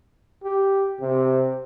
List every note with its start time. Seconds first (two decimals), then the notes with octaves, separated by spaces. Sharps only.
0.44 G4
1.01 C3